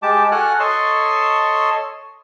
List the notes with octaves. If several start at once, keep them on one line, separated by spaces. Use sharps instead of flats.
G#3 G4 A5 D6
F#4 A4 F#5 G#5 F6 F#6
A4 C#5 D#5 A5 C6 C#6